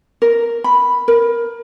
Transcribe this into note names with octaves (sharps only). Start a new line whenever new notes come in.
A#4
B5
A#4